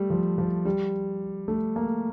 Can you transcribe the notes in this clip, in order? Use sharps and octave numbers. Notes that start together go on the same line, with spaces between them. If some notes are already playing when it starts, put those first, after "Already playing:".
Already playing: G3 A3
F3
F3
G3
A3
A#3